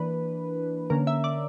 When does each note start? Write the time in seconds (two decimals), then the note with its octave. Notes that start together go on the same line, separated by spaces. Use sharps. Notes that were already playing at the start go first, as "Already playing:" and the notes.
Already playing: E3 A#3 D4 B4
0.90 D3 A#3 C#4 A#4
1.07 E5
1.24 D5